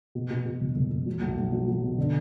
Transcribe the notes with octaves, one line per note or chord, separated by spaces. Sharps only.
B2
B2
B2
E1
E1
E1
F#3
B1
B1
F#3
F#3
B2
D3